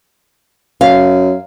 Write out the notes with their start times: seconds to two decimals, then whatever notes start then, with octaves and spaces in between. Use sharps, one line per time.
0.81 F#2 F5